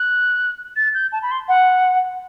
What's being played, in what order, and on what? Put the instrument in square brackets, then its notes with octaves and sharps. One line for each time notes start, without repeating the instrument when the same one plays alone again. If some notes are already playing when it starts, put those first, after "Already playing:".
Already playing: [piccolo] F#6
A6
G6
A5
B5
C6
F#5